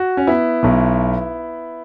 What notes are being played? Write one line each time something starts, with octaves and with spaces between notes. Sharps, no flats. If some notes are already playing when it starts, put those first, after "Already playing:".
Already playing: F#4
C#4
B3 E4
B1 B2